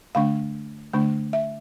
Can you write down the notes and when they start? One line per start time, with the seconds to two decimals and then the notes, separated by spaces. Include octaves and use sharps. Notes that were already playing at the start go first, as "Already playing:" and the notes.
0.15 D3 A3 D4 F5
0.93 D3 A3 D4
1.33 E5